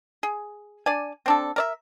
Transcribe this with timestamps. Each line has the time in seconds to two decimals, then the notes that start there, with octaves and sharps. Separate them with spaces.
0.23 G#4
0.86 D4 D5 G#5
1.26 C4 D4 A4
1.56 A#4 D5 E5